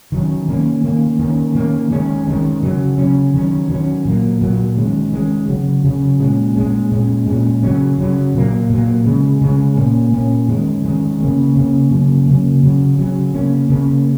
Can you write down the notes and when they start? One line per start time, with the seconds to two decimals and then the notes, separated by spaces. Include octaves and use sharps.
0.12 D#3 F#3 C#4
0.48 D#3 A#3 C#4
0.84 D#3 A#3 C#4
1.19 D#3 A#3 C#4
1.55 D#3 A#3 C#4
1.91 D#3 G#3 C#4
2.27 D#3 G#3 C#4
2.62 C#3 F#3 C#4
2.98 C#3 F#3 C#4
3.34 D#3 F#3 C#4
3.69 D#3 F#3 C#4
4.05 A#2 F#3 A#3
4.41 A#2 F#3 A#3
4.77 D#3 G#3 C#4
5.13 D#3 G#3 C#4
5.48 C#3 F#3 C#4
5.84 C#3 F#3 C#4
6.19 A#2 G#3 C#4
6.56 A#2 G#3 C#4
6.91 A#2 G#3 C#4
7.27 A#2 G#3 C#4
7.63 C#3 F#3 C#4
7.98 C#3 F#3 C#4
8.34 A#2 F#3 A#3
8.70 A#2 F#3 A#3
9.05 C#3 G#3 C#4
9.42 C#3 G#3 C#4
9.77 A#2 A#3 C#4
10.13 A#2 A#3 C#4
10.48 D#3 G#3 C#4
10.84 D#3 G#3 C#4
11.20 C#3 A#3 C#4
11.55 C#3 A#3 C#4
11.91 C#3 F#3 A#3 C#4
12.27 C#3 F#3 A#3 C#4
12.63 C#3 F#3 C#4
12.99 C#3 F#3 C#4
13.34 C#3 A#3 C#4
13.70 C#3 A#3 C#4